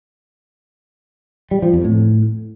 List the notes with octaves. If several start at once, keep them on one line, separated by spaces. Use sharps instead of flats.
G3
F3
F2
A2